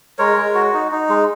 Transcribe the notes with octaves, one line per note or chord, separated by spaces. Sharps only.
G#3 A#4 C#5
G#3
F#4
D#4
D#4
G#3